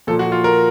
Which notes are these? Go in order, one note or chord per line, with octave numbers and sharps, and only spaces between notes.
A#2 F3 A4
F#4
F4
A#4